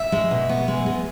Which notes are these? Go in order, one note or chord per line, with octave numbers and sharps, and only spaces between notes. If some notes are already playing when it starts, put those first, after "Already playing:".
Already playing: E5
G#3
B2
B3
G#3
G#3